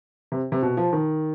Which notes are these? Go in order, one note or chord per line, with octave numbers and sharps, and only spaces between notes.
C3
C3
B2
F3
D#3